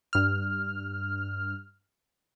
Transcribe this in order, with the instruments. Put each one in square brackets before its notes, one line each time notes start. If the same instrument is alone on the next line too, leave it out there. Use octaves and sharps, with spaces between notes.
[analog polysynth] G2 F6